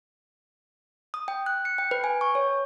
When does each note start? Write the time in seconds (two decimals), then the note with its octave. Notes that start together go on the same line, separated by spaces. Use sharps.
1.14 D#6
1.28 G5
1.46 F#6
1.65 C#7
1.78 G5
1.91 B4
2.04 G#5
2.21 C#6
2.35 C#5